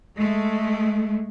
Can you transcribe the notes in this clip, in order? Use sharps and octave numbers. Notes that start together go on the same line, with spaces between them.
G#3 A3